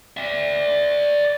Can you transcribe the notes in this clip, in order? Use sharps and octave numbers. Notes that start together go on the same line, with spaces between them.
D5 E5